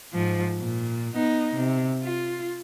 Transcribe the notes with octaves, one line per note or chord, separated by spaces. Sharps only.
G#2 F3
A#2
B3 D#4
C3
F4